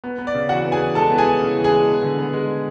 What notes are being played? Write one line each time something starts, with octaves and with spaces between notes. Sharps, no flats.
B3
B3
D5
C#3
E3 F#4 F#5
B3
G#4 G#5
E3
G#3 A4 A5
B3
G#4 G#5
E3
C#3
E3
G#4 G#5
G#3
B3
D3
B3
G#3